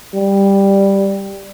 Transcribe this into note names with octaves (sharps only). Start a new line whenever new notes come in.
G3